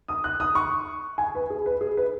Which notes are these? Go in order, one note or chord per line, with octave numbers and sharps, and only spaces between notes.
D#6
F#6
D#6
C#6
G#5
B4
G#4
B4
G#4
B4